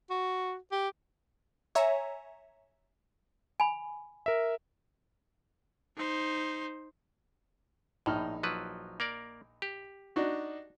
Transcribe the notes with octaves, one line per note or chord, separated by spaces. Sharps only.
F#4
G4
C#5 E5 G#5 A#5
G#5 B5
A#4 E5
D#4 C5
A#1 A2 D#4 F6
F3 F#3 B4
A#3 A#4 D5
G4
D4 D#4 F#4